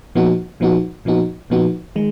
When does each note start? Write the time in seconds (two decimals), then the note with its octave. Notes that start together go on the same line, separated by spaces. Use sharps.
0.15 A#2 F3 B3 D#4 F#4
0.60 A#2 F3 B3 D#4 F#4
1.05 A#2 F3 B3 D#4 F#4
1.50 A#2 F3 B3 D#4 F#4
1.96 D#3 G#3